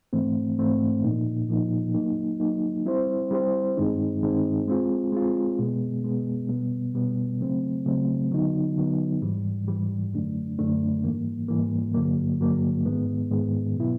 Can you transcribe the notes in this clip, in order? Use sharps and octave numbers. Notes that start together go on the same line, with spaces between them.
G#2 E3 A3 C4
G#2 E3 A3 C4
A#2 F3 A#3 D#4
A#2 F3 A#3 D#4
F#3 A#3 D#4
F#3 A#3 D#4
G3 C4 E4 G4 C5
G3 C4 E4 G4 C5
G2 D#3 G#3 C4 D#4
G2 D#3 G#3 C4 D#4
G#3 C4 F4
G#3 C4 F4
B2 G#3 B3
B2 G#3 B3
B2 G3 B3
B2 G3 B3
C#3 F#3 A3 C4
C#3 F#3 A3 C4
D3 F#3 B3 D#4
D3 F#3 B3 D#4
G#2 E3 G3
G#2 E3 G3
F#2 D3 F#3 A3 D4
F#2 D3 F#3 A3 D4
G#2 E3 G3 A#3
G#2 E3 G3 A#3
G2 D3 F#3 A#3
G2 D3 F#3 A#3
G#2 D#3 G#3 B3
G#2 D#3 G#3 B3
B2 F#3 B3 E4